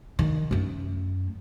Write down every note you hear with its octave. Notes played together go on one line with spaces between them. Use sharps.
D#3
F#2 A3